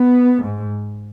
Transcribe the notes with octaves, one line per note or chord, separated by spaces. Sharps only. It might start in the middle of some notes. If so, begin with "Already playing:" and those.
Already playing: B3
G#2